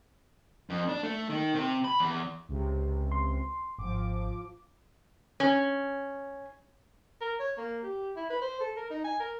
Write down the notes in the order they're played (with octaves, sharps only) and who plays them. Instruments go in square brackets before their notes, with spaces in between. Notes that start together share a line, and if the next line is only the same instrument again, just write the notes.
[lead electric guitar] F2
D4
A3
D#3
C3
B5
E2
[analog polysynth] C#2 C3
[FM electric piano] C6
[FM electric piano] G#1 [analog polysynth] F3 D6
[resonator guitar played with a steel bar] C#4
[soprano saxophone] A#4
C#5
A#3
G4
E4
B4
C5
A4
A#4
D#4
G#5
A#4